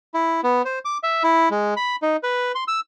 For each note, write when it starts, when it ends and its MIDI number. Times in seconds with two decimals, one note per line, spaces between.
0.14 0.41 64
0.44 0.62 59
0.65 0.79 72
0.85 0.98 86
1.03 1.23 76
1.23 1.49 64
1.50 1.74 56
1.77 1.96 83
2.02 2.17 63
2.23 2.52 71
2.55 2.64 84
2.68 2.80 88